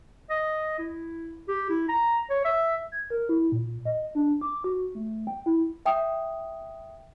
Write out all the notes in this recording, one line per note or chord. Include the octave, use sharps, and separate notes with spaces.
D#5
E4
G4
E4
A#5
C#5
E5
G#6
A#4
E4
A#2
D#5
D4
D6
F#4
A3
G5
E4
E5 G5 D#6